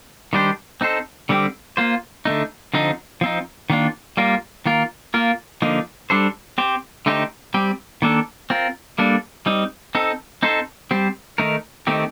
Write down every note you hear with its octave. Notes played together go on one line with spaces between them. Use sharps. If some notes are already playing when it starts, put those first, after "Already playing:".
D#3 G3 D4 G4 C5
C4 D#4 A4 C5
D3 G3 C4 G4
A#3 F4 C5
D3 A3 D#4
D3 F3 C4 D#4
F3 C4 D#4
D#3 A#3 D4 F4
G3 A#3 F4 A#4
D#3 A#3 F4 A#4
A#3 F4 A#4
D3 F3 A#3 D#4
G3 D4 A4 C5
C4 G4 C5
D3 A3 D#4 G4 C5
G3 C4 G4
D#3 A#3 D4 A4
C4 F4 A#4
G3 A#3 D4 A4
G3 C4 D#4
C4 D#4 A4
C4 D#4 A4 C5
G3 C4 G4 C5
D#3 A3 D#4 A#4
D#3 A3 C4 D#4 G4